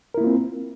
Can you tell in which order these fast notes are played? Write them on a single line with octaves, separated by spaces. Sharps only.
A#4 E4 A#3 F4 C4